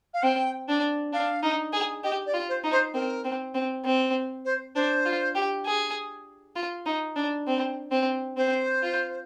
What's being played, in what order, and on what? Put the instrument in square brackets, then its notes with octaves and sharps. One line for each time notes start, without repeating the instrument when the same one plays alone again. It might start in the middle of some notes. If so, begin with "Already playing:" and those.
[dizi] F5
[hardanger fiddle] C4 [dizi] G5
[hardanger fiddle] D4
[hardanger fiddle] D4 [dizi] F5
[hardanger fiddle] D#4
G#4
[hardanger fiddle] G4 [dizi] D#5
[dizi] D5
[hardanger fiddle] F4
[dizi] C5
[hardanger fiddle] D#4
[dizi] C5
[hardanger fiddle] C4 [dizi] A#4
[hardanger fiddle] C4
C4
C4
[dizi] C5
[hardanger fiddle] D4 [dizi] C5
[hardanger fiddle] F4
G4
G#4
F4
D#4
D4
C4
C4
[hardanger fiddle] C4 [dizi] C5
[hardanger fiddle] F4